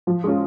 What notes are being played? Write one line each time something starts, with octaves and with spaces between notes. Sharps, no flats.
F3
G#3 C#4 F4